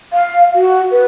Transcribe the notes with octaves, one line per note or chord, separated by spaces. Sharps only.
F5
F#4
B4